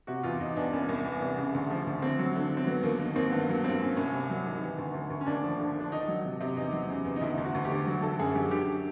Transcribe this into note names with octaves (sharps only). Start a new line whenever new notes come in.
C3 F#4
E2 F4
E2 D#4
E2 D4
C2 C#4
C2
E3
C2
C#3
D2
F3
D2
D3 C4
F#3
D3
D3
C4
F#3 B3
D#2 A#3
D#3 A#3
D#2 C4
G2 B3
F#3 A#3
G2 C4
G2 C#4
C2 C#4
C3
F#3
D#3
E3
D2
D2
D2
C#4
D#2 D4
F3
D3
D3 D4
D#3 D#4
F#3
C3
C3
E2 D#4
F#3
C#3
E2
D#4
D2 E4
D2
F#4
D2
G4
D3
F#3
D3 A4
F#2 G#4
F#3 G4
D3 G4